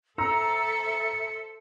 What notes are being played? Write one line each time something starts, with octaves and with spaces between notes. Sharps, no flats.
A4 C5 E5 A#5 E6 C#7